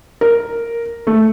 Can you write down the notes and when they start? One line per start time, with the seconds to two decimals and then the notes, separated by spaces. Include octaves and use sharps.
0.21 A#4
1.07 A3